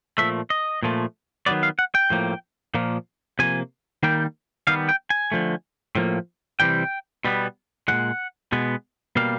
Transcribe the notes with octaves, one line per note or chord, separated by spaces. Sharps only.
A#2 F3 A3 E5
D#5
A#2 F3 A3
D#3 F#3 B3 D5
F5
F#5
G5
A2 F3 A#3
A#2 F3 A#3
C3 F3 A#3 G#5
D#3 G3 A#3 G5
D#3 G3 B3 F5
G5
G#5
D3 F3 A3
A2 F3 A#3
C3 E3 G3 G5
B2 G3 B3
A#2 F3 G#3 F#5
B2 G#3 B3
B2 G3 A#3 F5